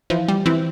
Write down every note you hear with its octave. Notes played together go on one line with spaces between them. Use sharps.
E3 F3
G3
E3 C4 E4